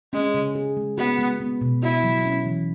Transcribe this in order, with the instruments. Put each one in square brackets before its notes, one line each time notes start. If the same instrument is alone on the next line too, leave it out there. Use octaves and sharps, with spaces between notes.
[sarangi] G#3 [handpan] C#4
[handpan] C#3
G#4
G#3
[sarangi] B3 [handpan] F#4
[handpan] G#3
B3
B2
[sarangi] E4 [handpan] F#4
[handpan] F#3
C#4
E3